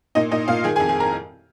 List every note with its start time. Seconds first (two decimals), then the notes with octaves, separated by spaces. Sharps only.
0.15 A#2 D#4 D#5
0.31 A#2 D#4 D#5
0.48 A#2 F4 F5
0.64 D#3 G#4 G#5
0.76 G#4 G#5
0.80 F2
0.88 G#4 G#5
1.00 A#4 A#5